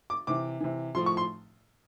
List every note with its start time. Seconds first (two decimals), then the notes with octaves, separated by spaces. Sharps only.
0.10 D6
0.27 C3 E3 D6
0.60 C3 E3
0.95 A2 F3 C6
1.06 C#6
1.17 C6